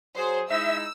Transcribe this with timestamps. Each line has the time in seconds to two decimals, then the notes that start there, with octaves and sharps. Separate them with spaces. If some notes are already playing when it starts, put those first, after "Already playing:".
0.17 F#3 G#4 C5
0.50 G#3 D#4 E4 E5 E6